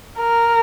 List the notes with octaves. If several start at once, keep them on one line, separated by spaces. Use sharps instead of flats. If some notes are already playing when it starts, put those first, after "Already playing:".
A#4